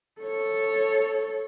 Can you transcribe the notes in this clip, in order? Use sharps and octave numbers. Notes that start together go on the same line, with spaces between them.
A4 C#5